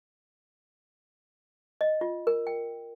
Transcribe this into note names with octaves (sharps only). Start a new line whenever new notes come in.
D#5
F4
A#4
G5